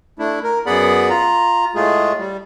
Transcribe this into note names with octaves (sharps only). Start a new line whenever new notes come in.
A3 D4 E4
A#4
F#2 B3 G#4 D5 F#5 B5
F4 A#5
A2 G#3 A3 F4 G#4
G3